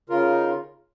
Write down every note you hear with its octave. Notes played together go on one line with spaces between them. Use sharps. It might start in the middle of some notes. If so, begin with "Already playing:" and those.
C#3 F4 A#4
D#4